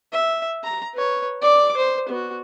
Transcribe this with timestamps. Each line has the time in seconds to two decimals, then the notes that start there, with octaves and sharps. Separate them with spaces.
0.13 E5
0.64 A#5
0.94 B4 C#5
1.41 D5 D6
1.77 C5
2.09 B3 F#4